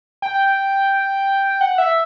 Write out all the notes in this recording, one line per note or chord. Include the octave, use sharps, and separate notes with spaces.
G5
F#5
E5